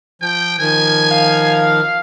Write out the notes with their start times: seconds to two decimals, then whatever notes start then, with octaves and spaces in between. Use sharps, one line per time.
0.22 F3 G5
0.59 D#3 F3 G#5
1.11 F5